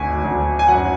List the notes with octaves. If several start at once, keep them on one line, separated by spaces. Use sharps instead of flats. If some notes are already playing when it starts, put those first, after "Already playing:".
Already playing: G#1 D2 G#5
D2
G#5
F#2 F#5